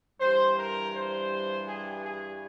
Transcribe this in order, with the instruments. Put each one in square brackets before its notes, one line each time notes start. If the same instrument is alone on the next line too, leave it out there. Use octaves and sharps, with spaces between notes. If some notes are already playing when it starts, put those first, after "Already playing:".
[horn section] G2 E3 G3 C5
A#4
C5
G#4
G#4